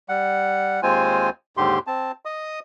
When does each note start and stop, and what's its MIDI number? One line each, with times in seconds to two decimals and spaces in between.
0.09 0.81 55
0.09 0.81 78
0.83 1.30 39
0.83 1.30 56
0.83 1.30 60
0.83 1.30 65
0.83 1.30 72
0.83 1.30 80
1.57 1.79 39
1.57 1.79 44
1.57 1.79 50
1.57 1.79 67
1.57 1.79 84
1.87 2.12 60
1.87 2.12 81
2.25 2.59 75
2.25 2.59 87